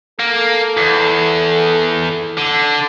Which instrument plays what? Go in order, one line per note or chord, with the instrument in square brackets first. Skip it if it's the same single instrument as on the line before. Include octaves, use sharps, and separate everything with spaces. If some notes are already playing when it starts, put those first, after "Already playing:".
[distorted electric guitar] A#3 [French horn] A4
[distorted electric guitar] E2
D3